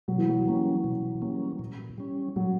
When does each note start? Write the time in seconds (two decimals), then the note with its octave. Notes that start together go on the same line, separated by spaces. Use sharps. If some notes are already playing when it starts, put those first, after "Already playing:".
0.08 B2 F#3
0.18 E3
0.29 F#3
0.46 G3 A#3 C#4
0.84 B2
1.22 G3 A#3 C#4
1.59 A#2
1.98 G3 C#4
2.36 A#2 F#3